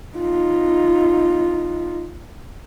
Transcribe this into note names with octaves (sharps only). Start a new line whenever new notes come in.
D#4 F4